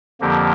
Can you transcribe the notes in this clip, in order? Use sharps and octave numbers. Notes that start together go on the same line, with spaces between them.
F2 D3 F3 A#3 G4